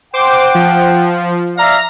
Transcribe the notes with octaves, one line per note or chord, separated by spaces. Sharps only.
C5 F#5 G5 D6
F3
D5 E5 F5 A#5 A#6